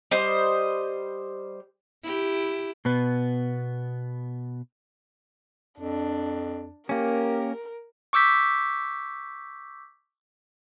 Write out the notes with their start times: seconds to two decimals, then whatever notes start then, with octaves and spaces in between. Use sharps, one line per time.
0.11 G3 C5 D#5
2.03 E4 G4
2.85 B2 B3
5.80 F2 D4
6.89 A#3 C#4 G4 A#4
8.13 C#6 D6 E6 G6 B6